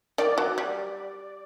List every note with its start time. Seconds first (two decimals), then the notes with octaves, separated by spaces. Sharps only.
0.18 D#3 D5
0.38 F#3
0.58 G3